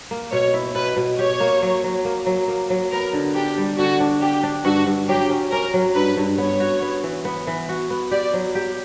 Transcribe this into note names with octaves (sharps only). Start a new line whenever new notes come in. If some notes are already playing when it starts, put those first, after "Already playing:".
A#3
B2 C#5
E4
B2 B4
B2
G4 C#5
A#3
F#3
F#3
A#3
F#3
A#3
F#3
B3 A#4
D3
D4 G4
G3
D3 F#4
D4
D4 G4
D4
G2 F#4
G2
F#3 G4
C#4
C#4 A#4
F#3
G2 B4
G2
B3 C#5
F#4
B3
E3
B3
E3
F#4
B3
G4 D5
F#3
G4